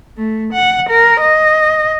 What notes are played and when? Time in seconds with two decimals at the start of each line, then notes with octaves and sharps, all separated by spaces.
0.18 A3
0.54 F#5
0.90 A#4
1.21 D#5